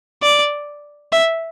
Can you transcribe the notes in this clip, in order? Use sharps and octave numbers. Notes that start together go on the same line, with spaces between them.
D5
E5